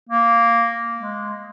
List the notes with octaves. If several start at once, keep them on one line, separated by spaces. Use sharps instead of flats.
A#3
G#3